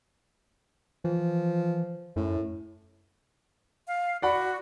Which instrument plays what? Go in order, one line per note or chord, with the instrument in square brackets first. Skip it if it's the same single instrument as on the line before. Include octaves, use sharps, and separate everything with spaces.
[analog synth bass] E3 [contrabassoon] F3
[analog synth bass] F#2 [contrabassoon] A2
[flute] F5
[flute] F#4 [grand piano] D5 F#5 B5